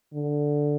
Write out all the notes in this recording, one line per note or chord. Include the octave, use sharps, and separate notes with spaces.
D3